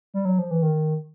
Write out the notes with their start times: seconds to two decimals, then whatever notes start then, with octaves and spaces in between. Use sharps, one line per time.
0.14 G3
0.25 F#3
0.39 F3
0.51 E3
0.62 D#3